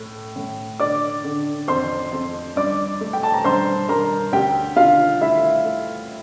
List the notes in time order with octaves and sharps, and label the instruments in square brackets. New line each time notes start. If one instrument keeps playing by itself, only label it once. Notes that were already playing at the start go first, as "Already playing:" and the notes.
Already playing: [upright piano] A2 A3
A2
D3 D5 D6
D3
F2 C5 C6
F2
G2 D5 D6
A3
G5
A5
A#5
G2 C5 C6
G2 A#4 A#5
D2 G4 G5
D3 F4 F5
A3 E4 E5
A3